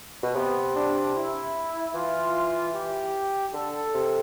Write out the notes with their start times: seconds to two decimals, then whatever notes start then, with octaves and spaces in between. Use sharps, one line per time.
0.23 B2
0.35 C3 B3
0.75 D4
1.16 E4
1.94 E3 F4
2.75 G4
3.54 D3 A4
3.94 C3